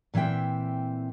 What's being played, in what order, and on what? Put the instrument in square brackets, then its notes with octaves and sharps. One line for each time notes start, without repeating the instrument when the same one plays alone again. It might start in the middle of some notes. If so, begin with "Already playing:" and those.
[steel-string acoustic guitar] A#2 E3 C4 E5 G5